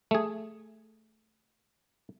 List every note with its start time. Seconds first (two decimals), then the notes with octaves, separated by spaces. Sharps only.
0.11 A3 G#4